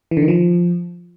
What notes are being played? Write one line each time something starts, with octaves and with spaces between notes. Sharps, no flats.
E3
D3
D#3
F3